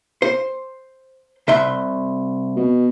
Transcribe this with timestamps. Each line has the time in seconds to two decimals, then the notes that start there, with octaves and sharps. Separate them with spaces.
0.22 C5
1.48 C2 E5 C6
2.56 B2